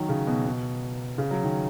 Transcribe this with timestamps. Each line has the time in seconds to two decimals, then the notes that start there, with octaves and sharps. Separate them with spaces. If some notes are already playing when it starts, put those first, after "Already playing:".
Already playing: D#3 F#3
0.09 C#3
0.27 B2
0.45 B2
1.18 C#3
1.31 F#3
1.43 D#3